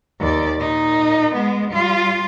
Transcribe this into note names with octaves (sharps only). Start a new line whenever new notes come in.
D#2 D5
A#2 D#4
G#3 B3
G3 F4